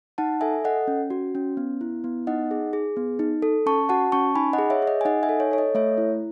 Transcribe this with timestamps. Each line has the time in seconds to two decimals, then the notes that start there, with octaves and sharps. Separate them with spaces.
0.18 D#4 F#5 A5
0.41 A4 E5 G#5
0.65 A4 D#5 F#5
0.88 C#4
1.10 F#4
1.35 C#4
1.57 B3
1.81 E4
2.04 B3
2.27 D#4 D#5 F#5
2.51 G#4
2.73 G#4
2.97 B3
3.19 D#4
3.42 A4
3.66 C#4 A5 C#6
3.89 F#4 F#5 A5
4.12 C#4 A5 C#6
4.36 D#4 G#5 B5
4.53 D#5 F#5
4.59 G#4
4.70 C#5 E5
4.82 G#4
4.87 D#5
5.01 G#5
5.05 D#4 D#5 F#5
5.23 E5 G#5
5.29 A4
5.40 C#5
5.51 A4 C#5
5.58 D#5
5.75 A3 C#5 E5
5.98 E4